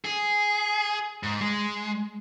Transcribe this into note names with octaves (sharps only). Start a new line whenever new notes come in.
G#4
G#2
G#3